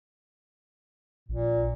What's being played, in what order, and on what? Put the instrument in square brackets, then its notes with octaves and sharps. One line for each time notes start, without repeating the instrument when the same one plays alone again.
[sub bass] A#1 [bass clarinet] A#2